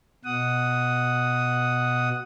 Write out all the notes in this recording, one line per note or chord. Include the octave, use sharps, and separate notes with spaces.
B2 F#5 D#6